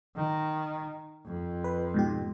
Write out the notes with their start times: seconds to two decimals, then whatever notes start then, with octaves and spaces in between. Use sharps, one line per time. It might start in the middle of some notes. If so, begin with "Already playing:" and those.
0.16 D#3
1.25 F2
1.64 B4
1.94 G#2 B2 G4